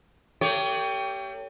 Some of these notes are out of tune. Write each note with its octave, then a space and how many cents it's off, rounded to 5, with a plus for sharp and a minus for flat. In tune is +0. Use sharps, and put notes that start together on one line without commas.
A3 +45 G4 +0 C#5 +25